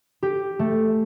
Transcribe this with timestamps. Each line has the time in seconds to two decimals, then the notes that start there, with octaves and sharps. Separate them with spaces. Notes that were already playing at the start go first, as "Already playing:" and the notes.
0.23 G4
0.59 A3